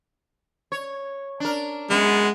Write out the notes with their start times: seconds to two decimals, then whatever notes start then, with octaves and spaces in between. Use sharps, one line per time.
0.72 C#5
1.40 D4 A#4
1.90 F#2 G#3 B3